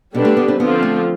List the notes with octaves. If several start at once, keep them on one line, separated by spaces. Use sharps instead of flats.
B2 D3 G3 D4 G4 B4
A3
B3
C4
D3 F3 B3 C4 F4
A3